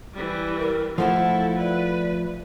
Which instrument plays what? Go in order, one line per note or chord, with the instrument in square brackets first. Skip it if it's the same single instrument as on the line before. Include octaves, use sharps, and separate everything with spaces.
[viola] E3 G3
[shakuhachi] A#4
[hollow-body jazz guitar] F3 A3 F4 [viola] E4 A4 [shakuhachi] F#5
[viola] B4 [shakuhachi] D5